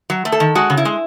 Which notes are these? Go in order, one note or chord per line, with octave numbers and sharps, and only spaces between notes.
F#3
A3
A4
D#3
G#3 F#4
C#3
E4
G#3